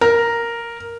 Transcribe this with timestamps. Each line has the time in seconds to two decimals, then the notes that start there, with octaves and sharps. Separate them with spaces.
0.01 A#4